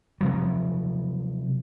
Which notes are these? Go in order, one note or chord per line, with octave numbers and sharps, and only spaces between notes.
C3 F3 F#3